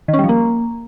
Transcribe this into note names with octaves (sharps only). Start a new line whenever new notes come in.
D#3
C#4
G3
F3
A#3